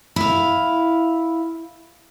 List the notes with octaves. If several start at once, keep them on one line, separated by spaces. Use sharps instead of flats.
E4 F5